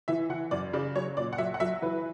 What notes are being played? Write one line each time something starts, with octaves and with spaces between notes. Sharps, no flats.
E3 E5
E3 F#5
F#2 D5
C#3 D5
F#3 C#5
A#2 D5
F#5
F#3 E5
F#5
F#3 E5
E3 B4